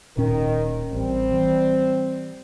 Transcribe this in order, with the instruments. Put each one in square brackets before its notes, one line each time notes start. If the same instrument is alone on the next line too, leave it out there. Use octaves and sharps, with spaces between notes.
[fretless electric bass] D1 A#2 C#4 [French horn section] D#3 A#4
[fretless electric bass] A1 [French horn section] G3 C4
[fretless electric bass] E3